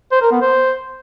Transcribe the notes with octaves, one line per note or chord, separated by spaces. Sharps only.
C5
A#4
B3
C5